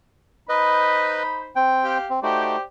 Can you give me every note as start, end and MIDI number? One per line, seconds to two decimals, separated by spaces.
0.49 1.51 63
0.49 1.23 71
0.49 1.51 72
0.49 1.23 75
0.49 1.51 83
1.56 1.98 60
1.56 1.98 79
1.84 2.08 67
1.84 2.08 77
2.10 2.20 60
2.23 2.57 57
2.23 2.57 63
2.23 2.57 66
2.23 2.61 67
2.23 2.61 72
2.23 2.61 74